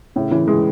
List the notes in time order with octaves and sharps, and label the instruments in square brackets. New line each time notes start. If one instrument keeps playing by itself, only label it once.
[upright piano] A2 C#3
C#3 E3
E3 G#3